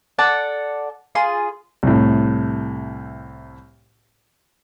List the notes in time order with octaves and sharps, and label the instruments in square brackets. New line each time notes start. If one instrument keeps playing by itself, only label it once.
[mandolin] A4 D5 F#5
F4 G#4 C6
[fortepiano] C2 A2